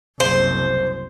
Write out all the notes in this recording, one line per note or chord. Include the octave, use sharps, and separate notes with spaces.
F#1 C2 C5